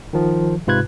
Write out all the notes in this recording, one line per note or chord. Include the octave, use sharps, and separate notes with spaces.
D#3 F3
G#2 C3 F4 B4 F#6 G#6